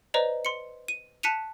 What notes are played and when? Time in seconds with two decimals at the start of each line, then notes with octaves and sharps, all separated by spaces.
0.14 B4 C5 D5 D#5 A#5
0.45 C6 C#7
0.88 D#7
1.23 A5 F#6 B6 C#7 D#7 F7